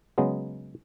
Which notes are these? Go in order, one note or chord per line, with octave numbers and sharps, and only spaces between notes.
C#3 F#3 G#3 B3